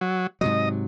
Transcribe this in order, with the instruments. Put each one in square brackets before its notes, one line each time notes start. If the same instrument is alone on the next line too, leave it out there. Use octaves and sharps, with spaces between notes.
[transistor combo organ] F#3
[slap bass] G#2 C3 F#3 [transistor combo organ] D#5